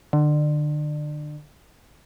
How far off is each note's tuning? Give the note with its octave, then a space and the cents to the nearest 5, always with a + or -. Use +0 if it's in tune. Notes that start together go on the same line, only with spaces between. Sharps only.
D3 +30